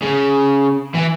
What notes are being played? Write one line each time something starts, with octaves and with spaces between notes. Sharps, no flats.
C#3
E3